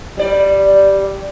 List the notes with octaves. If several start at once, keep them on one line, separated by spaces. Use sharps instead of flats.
G3 D5